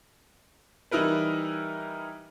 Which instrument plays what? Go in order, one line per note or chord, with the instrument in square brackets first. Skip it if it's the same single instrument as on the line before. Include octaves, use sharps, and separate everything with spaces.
[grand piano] E3 G3 D#4 E4 A#4 B4